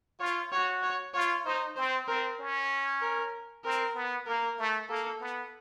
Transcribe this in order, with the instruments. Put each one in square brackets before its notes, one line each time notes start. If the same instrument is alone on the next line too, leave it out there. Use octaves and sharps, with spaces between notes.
[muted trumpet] F4 [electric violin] C#5
[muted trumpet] F#4 [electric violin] C#5
[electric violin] C#5
[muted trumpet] F4 [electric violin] C#5
[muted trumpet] D#4 [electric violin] C5
[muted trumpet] C4 [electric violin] C5
[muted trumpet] C4 [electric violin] A#4
[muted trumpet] C#4
[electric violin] A#4
[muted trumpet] C4 [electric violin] A#4
[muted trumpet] B3
[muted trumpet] A#3 [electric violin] A#4
[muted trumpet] A3
[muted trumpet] A#3 [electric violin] A4
[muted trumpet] B3